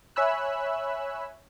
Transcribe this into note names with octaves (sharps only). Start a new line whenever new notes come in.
C#5 E5 G#5 B5 E6 F#6